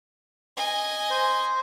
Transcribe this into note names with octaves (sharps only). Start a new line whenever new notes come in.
D#5 G#5
C5